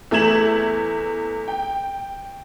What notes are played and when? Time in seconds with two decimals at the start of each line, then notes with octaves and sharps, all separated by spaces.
0.11 E2 A3 E5 G#6 E7 F#7
1.48 G5